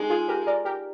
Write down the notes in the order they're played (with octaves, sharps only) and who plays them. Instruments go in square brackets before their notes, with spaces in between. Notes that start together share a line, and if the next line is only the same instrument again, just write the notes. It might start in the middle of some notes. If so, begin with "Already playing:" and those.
Already playing: [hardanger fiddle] G#3 [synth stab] D#4 G4
[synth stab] F4 G#4
G4 A#4
A#4 D5
G4 A#4